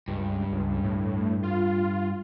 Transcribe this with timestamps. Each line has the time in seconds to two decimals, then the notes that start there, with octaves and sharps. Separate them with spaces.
0.08 C#2 G2
0.52 C#2
0.83 A2
1.43 F4